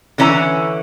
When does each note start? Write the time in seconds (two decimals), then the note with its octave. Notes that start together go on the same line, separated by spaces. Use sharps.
0.18 D3 E3 C#4 E4 A#5